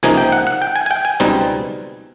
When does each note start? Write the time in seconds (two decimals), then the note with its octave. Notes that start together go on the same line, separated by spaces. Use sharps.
0.03 C#2 C3 F3 A#3 D#4 G#5
0.17 G5
0.32 F#5
0.47 F#5
0.62 G5
0.76 G#5
0.86 G#5
0.91 G5
1.05 G#5
1.20 C#2 B2 G3 C4 D#4